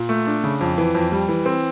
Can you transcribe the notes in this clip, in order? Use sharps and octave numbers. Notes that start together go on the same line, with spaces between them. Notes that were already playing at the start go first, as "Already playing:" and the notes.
Already playing: A#2
A3
D4
C#3
F2
E3
F2
G3
E3
C4